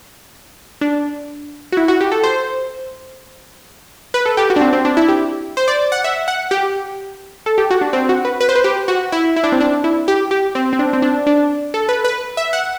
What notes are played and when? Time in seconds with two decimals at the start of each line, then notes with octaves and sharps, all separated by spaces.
0.81 D4
1.72 F#4
1.77 E4
1.88 F#4
2.00 G4
2.12 A4
2.23 C5
4.14 B4
4.26 A4
4.37 G4
4.50 F#4
4.56 D4
4.61 C4
4.73 C4
4.85 D4
4.97 E4
5.08 G4
5.57 C5
5.68 D5
5.92 F#5
6.04 E5
6.28 F#5
6.51 G4
7.46 A4
7.58 G4
7.70 F#4
7.81 D4
7.93 C4
8.09 F#4
8.25 B4
8.41 B4
8.49 C5
8.55 B4
8.64 G4
8.88 F#4
9.12 E4
9.36 E4
9.44 D4
9.52 C4
9.60 D4
9.84 E4
10.08 G4
10.31 G4
10.55 C4
10.73 C4
10.79 D4
10.93 C4
11.02 D4
11.27 D4
11.74 A4
11.89 B4
12.04 B4
12.37 E5
12.53 F#5